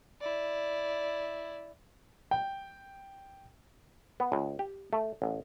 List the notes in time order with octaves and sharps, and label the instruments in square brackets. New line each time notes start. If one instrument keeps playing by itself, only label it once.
[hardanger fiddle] E4 D5
[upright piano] G5
[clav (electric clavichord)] B3
C#2
G4
A3
A1